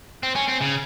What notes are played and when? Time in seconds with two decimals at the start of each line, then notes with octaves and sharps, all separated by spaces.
0.23 C4
0.35 C#4
0.48 C4
0.62 C#3